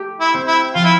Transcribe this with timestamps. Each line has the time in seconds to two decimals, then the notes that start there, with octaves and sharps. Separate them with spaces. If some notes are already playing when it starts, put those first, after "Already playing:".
Already playing: A3 G4
0.21 E4
0.34 C4
0.47 E4
0.75 F3 F4
0.84 E4